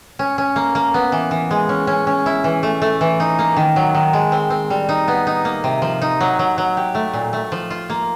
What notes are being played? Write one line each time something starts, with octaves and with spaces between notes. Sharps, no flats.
C#4
C#4
A#3
A#3
B3
E3
E3
G#3
C#4
C#4
C#4
E4
E3
A3
A3
E3
D#4
A#3
D#3
F#3
D#3
G#3
C4
C4
G3
D#4
B3
D#4
A#3
C3
F3
D#4
F#3
F#3
F#3
G4
A3
A#2
A3
F3
F4
A#3